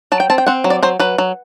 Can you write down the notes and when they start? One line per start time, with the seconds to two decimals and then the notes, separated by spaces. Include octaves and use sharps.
0.12 F#3 A5
0.20 G5
0.30 C4 A5
0.38 G5
0.47 C4 F#5
0.64 F#3
0.70 D5
0.83 F#3 C5
1.00 F#3 B4
1.18 F#3